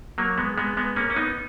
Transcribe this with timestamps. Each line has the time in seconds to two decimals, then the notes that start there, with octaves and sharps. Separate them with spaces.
0.18 F#3 A#3
0.38 G#3 B3
0.58 G#3 B3
0.77 G#3 B3
0.96 A#3 C#4
1.10 C#4
1.16 B3 D#4